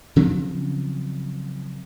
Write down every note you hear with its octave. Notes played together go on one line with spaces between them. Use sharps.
C#3 F3 F#3 C4